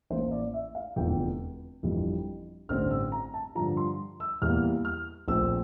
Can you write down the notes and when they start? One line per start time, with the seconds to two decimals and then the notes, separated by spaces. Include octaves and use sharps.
0.10 A1 A2 E3 A#3 C5
0.32 D5
0.54 E5
0.75 F5
0.96 F1 E2 D3 F3 G5
1.83 G1 F2 E3 G3
2.69 A1 G2 D3 G3 C4 F6
2.91 E6
3.12 A#5
3.34 A5
3.55 G2 D3 F3 A#5
3.77 C6
4.20 E6
4.42 E2 E3 G3 A#3 F6
4.85 F6
5.28 A#1 A#2 A3 C4 E6